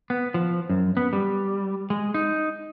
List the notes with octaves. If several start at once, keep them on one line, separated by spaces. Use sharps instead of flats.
B3
F3
F#2
B3
G3
G#3
D#4